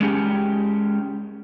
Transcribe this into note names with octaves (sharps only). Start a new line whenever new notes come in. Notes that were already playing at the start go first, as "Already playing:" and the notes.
G#3 C#4 G4